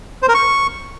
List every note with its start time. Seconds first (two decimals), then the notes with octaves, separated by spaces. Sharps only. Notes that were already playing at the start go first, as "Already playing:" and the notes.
0.22 C5
0.28 A#4
0.34 C#6